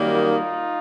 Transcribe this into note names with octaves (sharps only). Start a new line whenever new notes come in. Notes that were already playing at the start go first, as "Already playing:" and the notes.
Already playing: F#2 D#3 G3 A#3
D#4 F4